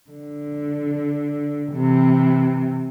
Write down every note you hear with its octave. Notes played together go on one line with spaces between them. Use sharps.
D3
C3 E3